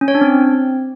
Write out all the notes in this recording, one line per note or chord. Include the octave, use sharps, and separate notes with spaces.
C#4
C#5
D4
C4